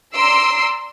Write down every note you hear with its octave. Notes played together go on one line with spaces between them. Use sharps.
D5 A#5 C6 E6 C7 D7